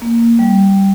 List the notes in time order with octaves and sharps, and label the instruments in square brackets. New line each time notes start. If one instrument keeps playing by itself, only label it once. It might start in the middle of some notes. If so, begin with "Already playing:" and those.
[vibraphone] A#3
G3